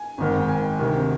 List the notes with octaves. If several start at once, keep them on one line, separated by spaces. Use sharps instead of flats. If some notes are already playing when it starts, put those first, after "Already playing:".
Already playing: G#5
G#1 G#2 D#3
G5
G#5
D2 C3 D#3